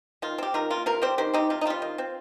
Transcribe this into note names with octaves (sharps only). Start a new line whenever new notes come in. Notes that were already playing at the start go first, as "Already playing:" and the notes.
D#3 F4
C4 G4
D#3 F4 A#4
A#3 F4
C3 F4 A#4
G3 C4 G4 C5
D#3 G4 C5
C4 D#4 G4
C3 F4
D#4
G3 C4 F4
D#3
C4